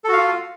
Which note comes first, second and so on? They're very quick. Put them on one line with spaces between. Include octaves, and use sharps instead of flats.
A4 F#4 F5 F4